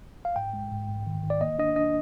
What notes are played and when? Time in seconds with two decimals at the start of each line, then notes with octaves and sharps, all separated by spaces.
0.25 F5
0.36 G#2 G5
0.53 G#3
0.71 G#2
0.89 G#2
1.07 D#3
1.24 D#3
1.30 D5
1.41 A#3 D#5
1.59 D4 D#5
1.76 D4 D#5